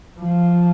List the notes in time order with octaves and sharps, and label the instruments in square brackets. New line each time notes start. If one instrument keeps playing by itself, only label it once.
[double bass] F3